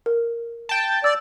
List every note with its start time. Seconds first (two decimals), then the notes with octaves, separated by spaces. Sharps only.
0.06 A#4
0.69 G5 A5
1.04 D5 E6